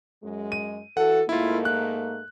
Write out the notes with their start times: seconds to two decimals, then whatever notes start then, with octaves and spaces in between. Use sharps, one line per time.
0.23 F#2 G#3
0.52 D#7
0.97 E3 F#4 A4 F#5
1.29 G#2 A3 A#3 E4 F4
1.65 F#6